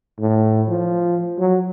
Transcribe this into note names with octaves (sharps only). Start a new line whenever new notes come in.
A2
F3
F#3